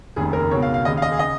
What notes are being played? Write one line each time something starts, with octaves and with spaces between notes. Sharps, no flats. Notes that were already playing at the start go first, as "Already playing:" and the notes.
F1 D#2 C#3 G#4
A#4
C#2 B2 C#5
F5
F5
D#2 C#3 D#5
F5
D#5
G#4
C#3 D#5